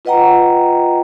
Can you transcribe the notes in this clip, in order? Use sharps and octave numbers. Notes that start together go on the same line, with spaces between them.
F4 B4 D#5 F#5 G5 A#5